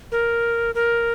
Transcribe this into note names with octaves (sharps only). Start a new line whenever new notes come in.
A#4
A#4